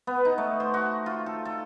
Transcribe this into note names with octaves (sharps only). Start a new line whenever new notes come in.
B3
D#4
A3
C5
F#4
F4
A4
A4